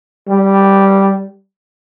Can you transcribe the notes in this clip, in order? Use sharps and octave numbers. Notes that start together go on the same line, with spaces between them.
G3